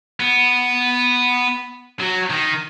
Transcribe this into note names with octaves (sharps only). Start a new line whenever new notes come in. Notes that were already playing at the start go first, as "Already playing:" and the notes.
B3
F#3
D#3